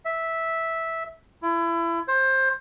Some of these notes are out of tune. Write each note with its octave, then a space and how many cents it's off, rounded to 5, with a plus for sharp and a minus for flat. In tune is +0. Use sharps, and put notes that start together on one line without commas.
E5 -10
E4 +30
C5 +20